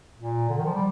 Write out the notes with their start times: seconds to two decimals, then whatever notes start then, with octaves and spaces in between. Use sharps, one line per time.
0.17 A#2
0.49 D3
0.58 D#3
0.65 F3
0.74 G3